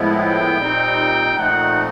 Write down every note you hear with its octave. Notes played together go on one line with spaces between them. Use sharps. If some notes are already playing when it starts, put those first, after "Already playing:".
Already playing: A2 F3 G#3 B3 E4
G5
A#2 G3 C4 D#4
A#2 F3 A3 C4 D#4 F#5